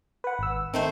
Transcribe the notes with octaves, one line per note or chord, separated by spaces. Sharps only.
B4 F#5
G#1 E6
D#3 A3 C4 C5